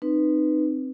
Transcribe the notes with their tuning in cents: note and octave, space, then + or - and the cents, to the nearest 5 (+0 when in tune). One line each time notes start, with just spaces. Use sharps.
C4 +0 D#4 -20 B4 +0